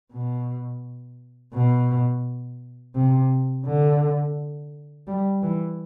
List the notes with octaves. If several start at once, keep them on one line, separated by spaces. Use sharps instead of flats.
B2
B2
C3
D3
G3
E3